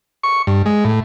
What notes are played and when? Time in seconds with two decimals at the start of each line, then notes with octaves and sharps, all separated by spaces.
0.23 C#6
0.47 G2
0.66 G#3
0.85 A2